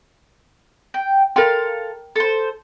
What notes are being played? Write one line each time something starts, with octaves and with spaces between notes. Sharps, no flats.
G5
A4 A#4 F5 G5 C6
A4 C5